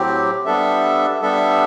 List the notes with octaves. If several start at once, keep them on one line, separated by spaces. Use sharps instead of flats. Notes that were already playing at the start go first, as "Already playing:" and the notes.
Already playing: A2 F#3 C4 G4
G3 B3 D4 A4 E5
G3 B3 D4 A4 E5